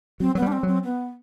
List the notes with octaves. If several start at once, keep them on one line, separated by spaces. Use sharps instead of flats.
F#3 C4
F#3 B3
G3
D4
C4
F#3 C4
B3